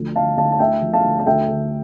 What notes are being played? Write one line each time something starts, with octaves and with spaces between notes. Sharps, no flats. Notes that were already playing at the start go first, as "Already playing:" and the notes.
Already playing: D2 F3
D3 F5 A5
D2 F5 A5
A5
D2 E5 G5
F3
F5 A5
D2
A5
D2 E5 G5
D3